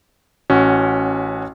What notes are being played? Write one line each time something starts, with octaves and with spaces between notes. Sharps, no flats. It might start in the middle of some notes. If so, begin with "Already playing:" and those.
A1 C#4 F#4